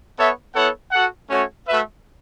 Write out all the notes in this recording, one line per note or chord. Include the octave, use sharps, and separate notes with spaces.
B3 A4 C#5 E5
B3 E4 A4 C#5 F#5
F#4 A4 F#5
A3 C#4 F#4 C#5
A3 F#4 B4 E5